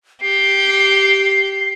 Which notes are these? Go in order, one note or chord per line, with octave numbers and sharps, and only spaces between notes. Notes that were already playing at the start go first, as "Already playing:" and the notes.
G4 C7